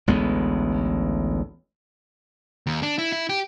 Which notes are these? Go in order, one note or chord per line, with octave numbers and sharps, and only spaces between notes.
A1 D2 G#3 B3
D#2
D4
E4
E4
G4